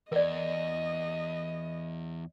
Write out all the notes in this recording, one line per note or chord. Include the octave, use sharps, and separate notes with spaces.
E2 A#4 D5 D#5